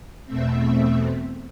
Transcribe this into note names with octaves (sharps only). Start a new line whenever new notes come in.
E2 B2 A3 C4 E5